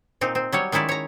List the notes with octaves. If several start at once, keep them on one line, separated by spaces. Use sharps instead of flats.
A#2 C4 D#4
C4
F#3 G3 C#5
D#3 G#3 C#4 E4 D5
C#5 A#5